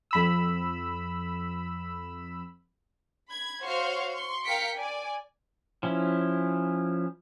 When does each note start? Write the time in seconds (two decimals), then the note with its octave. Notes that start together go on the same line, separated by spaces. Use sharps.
0.11 F2 B5 E6
3.29 B5 G#6
3.62 F#4 C5 C#5 F5 C6 C#6
4.11 C6 C#6
4.44 A#4 F5 G5 B6 C#7 D7
4.76 D5 G#5
5.83 F3 C#4 E4